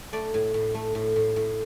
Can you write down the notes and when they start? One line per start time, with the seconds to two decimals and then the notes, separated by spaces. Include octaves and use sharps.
0.13 A3 D5
0.34 A2
0.54 A2
0.74 A3
0.95 A2
1.16 A2
1.36 A2